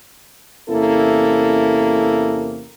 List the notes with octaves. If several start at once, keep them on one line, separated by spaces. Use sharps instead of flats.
E2 C3 A#3 C#4 E4 A4